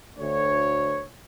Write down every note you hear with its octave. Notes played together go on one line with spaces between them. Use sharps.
D2 C#5